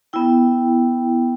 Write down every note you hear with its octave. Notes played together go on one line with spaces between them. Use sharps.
B3 E4 G5